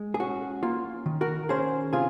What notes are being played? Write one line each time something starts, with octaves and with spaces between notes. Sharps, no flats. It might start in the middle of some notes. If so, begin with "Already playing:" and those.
Already playing: G#3
G#4
C#4 F#4
A#3 F4
D#3
F#4 A#4
C#4 G#4 C5
C3 F4 G#4